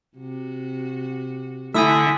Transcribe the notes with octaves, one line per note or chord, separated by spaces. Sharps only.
C3 F#4
D3 A3 E4 E5 G#5 D#6 E6